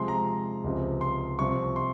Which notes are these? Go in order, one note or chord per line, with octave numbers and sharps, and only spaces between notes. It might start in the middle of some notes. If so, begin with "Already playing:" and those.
Already playing: C3 F3 G#3 C6
A#5
C#2 C3 F3
C6
C2 C3 F3 C#6
C6